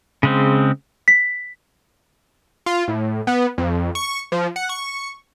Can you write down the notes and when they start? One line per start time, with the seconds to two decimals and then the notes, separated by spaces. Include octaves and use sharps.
0.23 C#3 G#3 C4
1.08 B6
2.66 F4
2.88 A2
3.27 B3
3.58 F2
3.95 C#6
4.32 F3
4.56 F#5
4.69 C#6